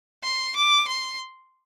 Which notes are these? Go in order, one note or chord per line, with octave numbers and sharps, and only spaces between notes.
C6
D6
C6